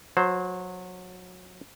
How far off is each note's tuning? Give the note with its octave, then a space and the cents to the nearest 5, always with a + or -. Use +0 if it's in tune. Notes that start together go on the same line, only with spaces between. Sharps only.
F#3 -25 C5 +0